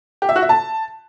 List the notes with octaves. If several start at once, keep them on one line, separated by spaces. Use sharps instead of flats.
G4
E5
F#4
E5
A5